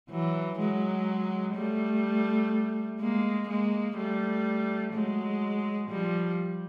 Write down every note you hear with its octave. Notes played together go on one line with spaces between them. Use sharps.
E3 F#3
F#3 G#3
G3 A3
G#3 A#3
G#3 A#3
G3 A3
F#3 G#3
F3 G3